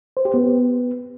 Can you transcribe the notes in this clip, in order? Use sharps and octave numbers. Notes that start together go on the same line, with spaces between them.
C5
G4
B3